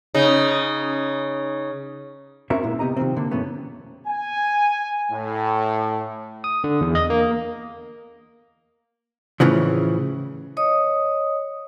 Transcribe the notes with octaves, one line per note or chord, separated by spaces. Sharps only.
C#3 D#4
C4 C#4 F#4 A#4 C#5 E5
A#2 G#3 B3 E4
C3 B3 G4 D#5 A#5
C3 D#3 F3 C4
D3 A#3
F#2 B2 E3 A3 B3 C#4
G#5
A2
D#6
D3
E2
D#5
A#3
A2 C#3 E3 F3
C#5 D#5 D#6